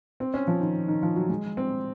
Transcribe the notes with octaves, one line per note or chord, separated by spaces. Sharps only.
C4
C#4
F3
D#3
D#3
F3
F#3
G#3
C4